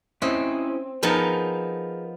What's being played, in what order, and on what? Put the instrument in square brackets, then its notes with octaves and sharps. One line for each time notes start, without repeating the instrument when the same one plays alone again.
[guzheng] C4 [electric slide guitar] C#4 E4 D#5
[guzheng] F3 B3 D#4 [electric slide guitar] G#4 A#4 A#5